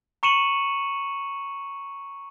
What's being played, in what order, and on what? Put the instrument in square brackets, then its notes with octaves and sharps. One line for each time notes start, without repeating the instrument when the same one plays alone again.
[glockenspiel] A#5 C#6 C#7 D#7 E7 F#7